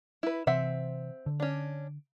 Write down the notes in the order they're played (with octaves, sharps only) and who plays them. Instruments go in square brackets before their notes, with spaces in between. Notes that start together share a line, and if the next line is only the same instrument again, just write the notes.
[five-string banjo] E4 B4
[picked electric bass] C3 E3 [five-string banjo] C4 E5 F#5
[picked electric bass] D3
[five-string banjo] C#4 D4